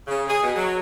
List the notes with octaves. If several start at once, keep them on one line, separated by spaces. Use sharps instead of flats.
C#3
G#4
B2
F#3